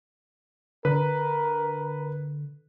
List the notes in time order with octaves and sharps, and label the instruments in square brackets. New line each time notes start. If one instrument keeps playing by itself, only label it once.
[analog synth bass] D3 [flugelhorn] A#4 [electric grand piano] B4